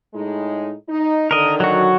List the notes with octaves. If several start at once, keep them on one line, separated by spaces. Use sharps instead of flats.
A2 G#3 D#4
D#4
D3 D#3 A#4 D#5
F#3 F#4